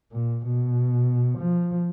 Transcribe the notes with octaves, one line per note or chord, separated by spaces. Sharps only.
A#2
B2
F3